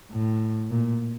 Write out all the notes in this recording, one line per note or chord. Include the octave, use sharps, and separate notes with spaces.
A2
A#2